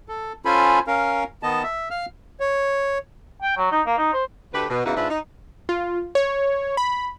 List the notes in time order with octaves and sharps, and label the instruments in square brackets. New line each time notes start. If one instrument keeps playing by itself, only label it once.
[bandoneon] A4
C#4 F4 A4 C5 G#5 B5
C#4 A#4 F5
D#3 B3 D#5 A5
E5
F5 F6
[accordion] C#5
[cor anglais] G5
F#3
D#4
A#3
D#4
C5
[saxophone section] D2 A3 G4 B4
B2
E2 C#3 E3 D#4 F#4 E5
G#2 D4 F4 B4 E5
D#4
[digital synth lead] F4
C#5
B5